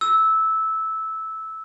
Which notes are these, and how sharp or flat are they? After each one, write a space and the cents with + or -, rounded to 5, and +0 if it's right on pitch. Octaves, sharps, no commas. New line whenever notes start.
E6 -15